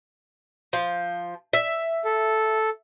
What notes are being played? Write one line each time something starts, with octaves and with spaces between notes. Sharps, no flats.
F3
E5
A4